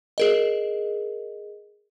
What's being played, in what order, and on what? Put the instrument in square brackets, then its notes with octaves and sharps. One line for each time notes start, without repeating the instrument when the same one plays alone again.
[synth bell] G#4 A#4 D#5